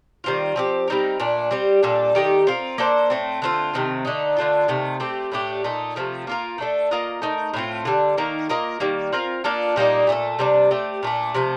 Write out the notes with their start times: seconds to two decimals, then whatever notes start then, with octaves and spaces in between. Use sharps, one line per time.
0.24 D#3 G3 C4 F4
0.56 F3 C4 G4
0.88 G3 C4 D#4 A#4
1.20 A#2 A3 D4
1.51 G3 C4 G4
1.83 A#2 G3 D4 A4
2.15 D#3 A3 D#4 G4
2.47 C4 F4 A#4
2.78 A#3 D4 A4 C5
3.10 A2 A3 C4
3.42 D3 A3 C4 F4
3.74 C3 D#3 A3 C4
4.05 D3 A3 D#4
4.37 D3 A3 D4 F4
4.68 C3 D#3 A3
5.00 A3 C4 G4
5.32 A2 A3 D4 G4
5.64 A#2 A3 D#4
5.96 C3 F3 A3
6.27 A#3 F4 A#4
6.58 A3 D4 A4
6.91 A#3 F4 A#4 D#5
7.22 A3 D#4 A#4
7.54 A2 A3 C4 F4
7.85 D3 G3 D4
8.17 D#3 A#3 D#4 A#4
8.49 A#3 F4 A#4 D#5
8.80 D#3 G3 A#3
9.13 C4 F4 A#4 F5
9.44 A#3 D4 F4 A4
9.76 A#2 G3 A#3 D#4
10.07 A#2 A3 D#4 A4
10.39 C3 G3 D4
10.71 A3 C4 G4
11.03 A#2 A3 D4
11.34 C3 F3 A3